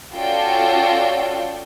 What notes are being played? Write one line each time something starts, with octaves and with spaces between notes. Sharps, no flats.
C#4 F4 F#4 A4 D5 G5